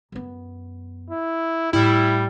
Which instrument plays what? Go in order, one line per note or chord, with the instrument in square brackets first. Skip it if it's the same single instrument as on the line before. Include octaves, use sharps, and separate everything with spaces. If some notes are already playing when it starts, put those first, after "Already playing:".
[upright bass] F#2 B3
[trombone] E4
[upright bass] A2 [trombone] G3 [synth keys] E4